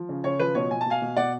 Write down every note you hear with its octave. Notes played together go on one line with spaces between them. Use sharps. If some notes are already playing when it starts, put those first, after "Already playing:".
Already playing: F3
C#3
C#3 C#5
F3 B4
B2 C#5
B2 G#5
A5
B2 F5 G#5
B2
B2 D5 F#5